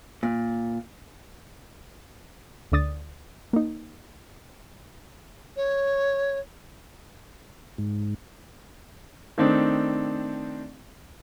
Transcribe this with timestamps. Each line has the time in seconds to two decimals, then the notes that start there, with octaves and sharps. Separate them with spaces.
0.23 A#2
2.72 D2 D3 D5 D#6 A6
3.53 A#3 D#4
5.56 C#5
7.78 G#2
9.38 D#3 A3 C4 D4 D#4